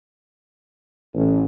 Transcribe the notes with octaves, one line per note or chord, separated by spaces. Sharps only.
A1